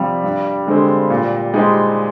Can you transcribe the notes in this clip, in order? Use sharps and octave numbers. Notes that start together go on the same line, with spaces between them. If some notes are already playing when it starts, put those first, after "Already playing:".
Already playing: F2 C3 F3 G3
G2
D3 G#3 C4
A#2
G#3 D#4 G4 C5